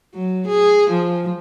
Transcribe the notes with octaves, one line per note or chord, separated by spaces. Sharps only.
F#3
G#4
F3